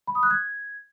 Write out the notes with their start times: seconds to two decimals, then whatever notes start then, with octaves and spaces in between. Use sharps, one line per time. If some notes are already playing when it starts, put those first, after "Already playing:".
0.07 B5
0.15 D#6
0.23 F#6
0.30 G#6